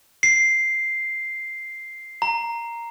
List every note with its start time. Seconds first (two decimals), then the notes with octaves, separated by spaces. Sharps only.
0.23 C7
2.22 A#5